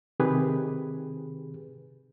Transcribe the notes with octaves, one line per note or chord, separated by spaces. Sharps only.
C3 D#3 G4 G#4 B4